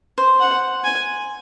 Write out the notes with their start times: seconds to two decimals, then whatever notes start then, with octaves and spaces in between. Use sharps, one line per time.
0.18 C5
0.40 F#5
0.84 G#5